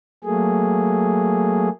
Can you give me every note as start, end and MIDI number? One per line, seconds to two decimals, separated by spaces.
0.24 1.69 54
0.24 1.69 57
0.24 1.69 58
0.24 1.69 68